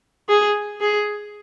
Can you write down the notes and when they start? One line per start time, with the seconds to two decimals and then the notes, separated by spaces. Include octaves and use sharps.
0.29 G#4
0.81 G#4